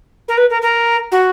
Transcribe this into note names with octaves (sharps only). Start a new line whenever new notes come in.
A#4
B4
A#4
A#4
F#4